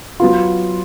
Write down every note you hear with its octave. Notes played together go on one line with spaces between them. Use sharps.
F#3 B3 F4